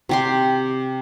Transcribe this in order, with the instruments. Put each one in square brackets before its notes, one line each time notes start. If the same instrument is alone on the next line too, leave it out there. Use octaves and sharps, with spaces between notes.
[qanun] C3 G4 C6